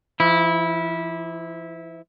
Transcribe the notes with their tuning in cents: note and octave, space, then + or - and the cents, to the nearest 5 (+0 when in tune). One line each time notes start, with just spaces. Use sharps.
F3 -45 E4 -15